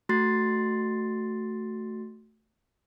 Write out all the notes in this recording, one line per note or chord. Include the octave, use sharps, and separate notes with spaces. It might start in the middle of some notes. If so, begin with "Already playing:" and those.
A3 F#4 C6 A6 C7